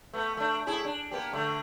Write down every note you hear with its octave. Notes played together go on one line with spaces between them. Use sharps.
A3 B3
A3 D4
A2 E4 G#4
D4
A#3 B3 G4
D3 A3